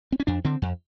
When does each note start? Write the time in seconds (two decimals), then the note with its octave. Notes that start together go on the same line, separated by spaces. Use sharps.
0.12 C4
0.20 C#4
0.27 F2 D4
0.45 D3 C4
0.62 F2